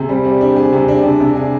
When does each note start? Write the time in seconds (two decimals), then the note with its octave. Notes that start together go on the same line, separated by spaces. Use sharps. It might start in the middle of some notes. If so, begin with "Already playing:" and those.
Already playing: C3 G#4
0.09 G3 C4
0.25 G3
0.41 D4
0.56 G#4
0.73 C3
0.88 D4
1.04 C3 D4
1.20 C3
1.35 G#4